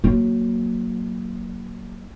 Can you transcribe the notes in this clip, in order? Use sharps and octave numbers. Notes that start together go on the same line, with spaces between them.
F#3 A#3